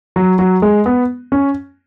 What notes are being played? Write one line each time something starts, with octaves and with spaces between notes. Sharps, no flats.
F#3
F#3
G#3
B3
C#4